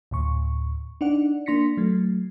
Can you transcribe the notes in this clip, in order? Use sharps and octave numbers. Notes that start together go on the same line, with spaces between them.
D2 A2 C#6
D4 D#4 D5 F#5
A#3 D4 C6 A#6 B6 C#7
F#3 A3